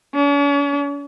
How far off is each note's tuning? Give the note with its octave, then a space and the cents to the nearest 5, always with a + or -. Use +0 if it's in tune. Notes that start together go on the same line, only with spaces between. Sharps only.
C#4 +45